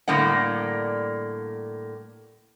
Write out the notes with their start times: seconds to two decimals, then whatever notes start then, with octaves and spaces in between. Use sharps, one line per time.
0.08 A2 D3 G3 A#3 D#5 F#5